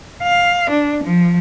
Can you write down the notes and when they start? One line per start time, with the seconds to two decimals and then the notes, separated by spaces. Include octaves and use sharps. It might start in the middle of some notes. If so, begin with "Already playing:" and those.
0.23 F5
0.70 D4
1.04 F3